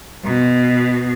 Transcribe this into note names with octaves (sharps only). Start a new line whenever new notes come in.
B2